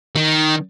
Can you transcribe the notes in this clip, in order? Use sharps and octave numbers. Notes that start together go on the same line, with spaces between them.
D#3